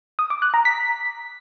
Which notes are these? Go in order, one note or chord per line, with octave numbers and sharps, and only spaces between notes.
D#6
D6
F#6
A#5
B6